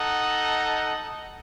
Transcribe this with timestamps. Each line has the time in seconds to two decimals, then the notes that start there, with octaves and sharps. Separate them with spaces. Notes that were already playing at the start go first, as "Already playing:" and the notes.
Already playing: D#4 A4 D#5 F#5